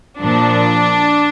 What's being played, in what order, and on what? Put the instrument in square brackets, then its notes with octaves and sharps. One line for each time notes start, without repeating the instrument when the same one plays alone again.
[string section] A#2 F3 D4